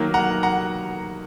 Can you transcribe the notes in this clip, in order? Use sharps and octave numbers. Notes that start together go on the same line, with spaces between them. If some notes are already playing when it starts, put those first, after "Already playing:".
Already playing: D#3 F#3 A#3
F#5 A#5
F#5 A#5